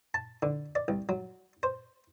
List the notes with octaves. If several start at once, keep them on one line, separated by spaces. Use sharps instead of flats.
A5
D3
D5
C2
F#3
C5